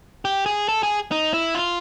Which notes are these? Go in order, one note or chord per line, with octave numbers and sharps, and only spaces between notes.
G4
G#4
A4
G#4
D#4
E4
F4